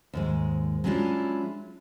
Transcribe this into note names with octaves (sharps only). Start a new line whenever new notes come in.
D#2 G#2 G#3
F#3 G#3 C#4 D4 E4 F4